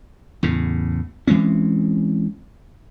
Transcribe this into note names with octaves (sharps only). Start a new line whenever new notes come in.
E2 A2 C#3
E3 G#3 C4 C#4